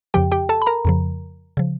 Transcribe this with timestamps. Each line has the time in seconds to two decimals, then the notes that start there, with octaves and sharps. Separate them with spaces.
0.14 F2 C#3 F3 G4 G5
0.32 G4 G5
0.49 A4 A5
0.62 B5
0.66 A#4 A#5
0.85 F2 C#3 F3
1.57 C#3 F3